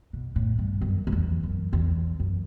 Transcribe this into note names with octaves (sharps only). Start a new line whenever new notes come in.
B2
A2
G2
F#2
F#2
E2
F#2
E2
F#2